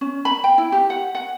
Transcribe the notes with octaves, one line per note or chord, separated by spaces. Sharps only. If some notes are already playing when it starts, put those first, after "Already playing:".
C#4
B5
G5
E4
G4
F#5
F#5